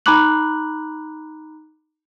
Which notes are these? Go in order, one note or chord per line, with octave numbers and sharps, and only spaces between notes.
D#4 A#5 B5 D6 F#6 F#7